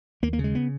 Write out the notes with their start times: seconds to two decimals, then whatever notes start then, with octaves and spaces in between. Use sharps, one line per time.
0.23 D#2 A#3
0.33 A#3
0.39 C#3
0.44 G#3
0.55 B3